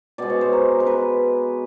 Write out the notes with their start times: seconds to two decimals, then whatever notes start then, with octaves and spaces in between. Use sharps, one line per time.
0.18 B2 G#3 D5
0.30 C#5
0.41 C5
0.53 A#4
0.80 A#4
0.87 B4